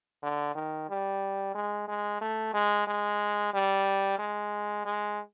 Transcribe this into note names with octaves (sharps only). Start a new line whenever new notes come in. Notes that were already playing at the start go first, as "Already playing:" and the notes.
D3
D#3
G3
G#3
G#3
A3
G#3
G#3
G3
G#3
G#3